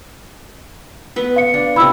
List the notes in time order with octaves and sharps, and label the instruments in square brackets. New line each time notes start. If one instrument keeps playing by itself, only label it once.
[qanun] B3 B4
[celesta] F5 C#7
[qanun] D4
[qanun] C3 E4 [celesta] B5 E6